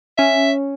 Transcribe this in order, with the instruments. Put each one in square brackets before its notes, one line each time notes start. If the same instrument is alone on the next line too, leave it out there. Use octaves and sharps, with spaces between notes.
[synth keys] C#4 [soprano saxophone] E5